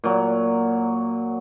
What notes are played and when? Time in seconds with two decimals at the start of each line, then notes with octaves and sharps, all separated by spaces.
0.04 A#2 F#3